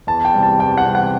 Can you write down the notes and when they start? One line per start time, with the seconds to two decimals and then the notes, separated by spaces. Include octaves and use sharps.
0.07 E2 A5
0.25 G5
0.34 C3 G3
0.43 A5
0.59 E2 G5
0.78 F#5
0.85 C3 G3
0.95 F#5